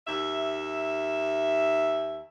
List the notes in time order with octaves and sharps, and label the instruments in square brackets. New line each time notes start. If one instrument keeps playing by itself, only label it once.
[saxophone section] D#2 E5